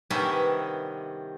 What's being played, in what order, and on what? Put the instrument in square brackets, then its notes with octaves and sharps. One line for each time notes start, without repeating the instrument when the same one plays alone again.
[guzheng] G2 C3 D#3 B3 C#4 E5